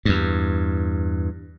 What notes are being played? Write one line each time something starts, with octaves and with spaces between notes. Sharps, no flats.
E2 G2